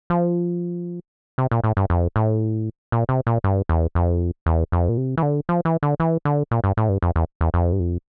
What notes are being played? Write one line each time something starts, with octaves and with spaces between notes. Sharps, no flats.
F3
C3
A#2
A2
G2
F2
A2
A#2
C3
A#2
G2
E2
F2
E2
F2
A#2
C3
E3
D3
F3
E3
D3
E3
D3
A#2
G2
A2
G2
F2
E2
E2
F2
G2
F2